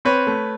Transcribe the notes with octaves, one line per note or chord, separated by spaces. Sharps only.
C4 B4 C#5
A3